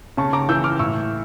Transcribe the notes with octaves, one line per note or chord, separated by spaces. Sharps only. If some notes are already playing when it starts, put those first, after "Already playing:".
C#3 A5 C#6
A#5 D6
E3 E6 G6
D6 F6
A2 C#6 E6